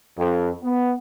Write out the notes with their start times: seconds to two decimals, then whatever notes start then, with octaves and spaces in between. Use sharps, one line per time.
0.16 F2
0.63 B3